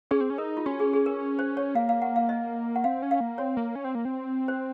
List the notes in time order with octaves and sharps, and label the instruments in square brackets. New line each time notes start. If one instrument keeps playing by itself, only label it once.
[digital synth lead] C#4 [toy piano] G#4
[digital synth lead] C4
C#4
[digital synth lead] D#4 [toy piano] A#4
[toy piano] F4
[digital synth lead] C#4 [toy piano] F#4
[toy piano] G#4
G#4
A#4
C5
C#5
[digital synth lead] A#3 [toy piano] F5
[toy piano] F5
F#5
F5
D#5
F#5
[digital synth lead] C4 [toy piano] F5
[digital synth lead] C#4
[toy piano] F5
[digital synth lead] A#3
[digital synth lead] C4 [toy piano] C#5
[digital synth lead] A#3
C#4
C4
A#3
C4
[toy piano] C5